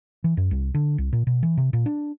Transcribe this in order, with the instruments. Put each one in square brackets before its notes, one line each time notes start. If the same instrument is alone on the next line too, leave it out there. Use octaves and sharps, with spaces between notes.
[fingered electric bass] E3
F#2
C2
D3
C2
A#2
B2
E3
C3
A#2
D4